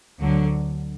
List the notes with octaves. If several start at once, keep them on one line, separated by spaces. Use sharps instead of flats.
D2 D3 F#3